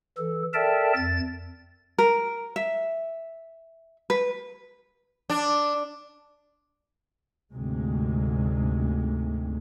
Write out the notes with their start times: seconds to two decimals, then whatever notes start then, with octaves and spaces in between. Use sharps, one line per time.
0.18 E3 A4
0.54 A4 A#4 D5 E5 G5 A5
0.97 F2 A6
1.98 A#4
2.56 E5
4.10 B4
5.30 D4
7.53 D2 G#2 C3 G#3